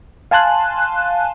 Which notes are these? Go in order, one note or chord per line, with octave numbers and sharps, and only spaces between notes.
F5 G#5 A5 C6 F#6